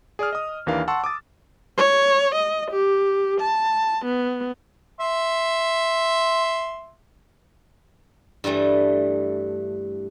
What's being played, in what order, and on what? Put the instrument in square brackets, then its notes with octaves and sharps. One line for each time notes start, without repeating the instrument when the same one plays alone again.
[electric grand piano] G#4 D5 D#6 F6
D#5 D#6
D#2 E3 D4 A#4 F5
F#5 A5 C6 C#6 E6
D6 D#6 A6
[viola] C#5
D#5
G4
A5
B3
[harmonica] E5 C6
[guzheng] G2 E3 G3 A3